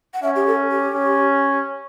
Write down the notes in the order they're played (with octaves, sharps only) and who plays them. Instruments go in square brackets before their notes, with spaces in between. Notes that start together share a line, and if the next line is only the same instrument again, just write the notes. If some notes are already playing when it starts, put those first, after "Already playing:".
[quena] F#5
[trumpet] C#4 [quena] E5
[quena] G4
A4
G4
[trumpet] C#4